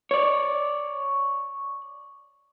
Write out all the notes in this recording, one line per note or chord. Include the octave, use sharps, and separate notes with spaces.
C#5 D5